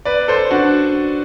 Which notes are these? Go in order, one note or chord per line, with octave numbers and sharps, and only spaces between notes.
B4 D5
A4 C5
D4 F#4